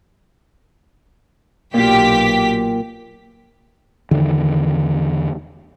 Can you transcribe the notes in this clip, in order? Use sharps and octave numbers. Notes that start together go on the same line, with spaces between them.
B1 A#2 F4 G4 B6
E2 D3 D#3